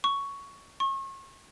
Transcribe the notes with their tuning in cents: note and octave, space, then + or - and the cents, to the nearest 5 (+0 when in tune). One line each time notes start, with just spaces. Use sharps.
C#6 +10
C#6 -35